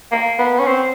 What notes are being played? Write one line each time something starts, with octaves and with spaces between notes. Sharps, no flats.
A#3
B3
C#4
C4